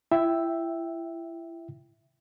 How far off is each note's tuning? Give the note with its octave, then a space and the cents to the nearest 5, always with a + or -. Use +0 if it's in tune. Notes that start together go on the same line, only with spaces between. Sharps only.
E4 +30 E5 +0 G5 +0